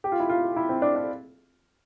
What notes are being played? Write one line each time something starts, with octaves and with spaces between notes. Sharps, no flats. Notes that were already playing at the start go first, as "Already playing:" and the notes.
G4
F4
E4
F4
E4
C4
D4
D4